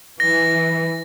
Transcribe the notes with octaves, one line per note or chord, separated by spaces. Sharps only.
E3 A#6